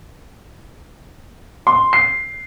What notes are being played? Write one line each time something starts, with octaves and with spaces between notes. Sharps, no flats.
C6
C7